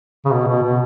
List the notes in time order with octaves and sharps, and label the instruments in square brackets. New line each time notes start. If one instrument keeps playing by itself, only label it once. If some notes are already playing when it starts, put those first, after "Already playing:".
[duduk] C#3
B2
B2
B2